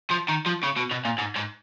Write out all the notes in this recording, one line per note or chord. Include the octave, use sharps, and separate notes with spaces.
F3
D#3
F3
C#3
B2
B2
A#2
G#2
G#2